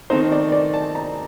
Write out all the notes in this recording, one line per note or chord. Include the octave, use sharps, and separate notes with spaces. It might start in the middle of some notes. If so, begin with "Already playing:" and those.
D#3 A3 C4 D#4 C5
D5
D5
A5
A#5